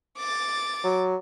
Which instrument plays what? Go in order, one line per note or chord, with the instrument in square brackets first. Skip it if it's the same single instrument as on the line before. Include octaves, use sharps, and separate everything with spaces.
[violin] D6 A6
[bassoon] F#3